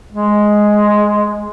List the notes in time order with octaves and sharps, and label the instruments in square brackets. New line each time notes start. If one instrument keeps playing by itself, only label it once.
[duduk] G#3